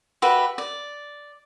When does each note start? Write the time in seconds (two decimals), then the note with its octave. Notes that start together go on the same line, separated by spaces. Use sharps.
0.22 F#4 G4 B4 E5
0.58 D5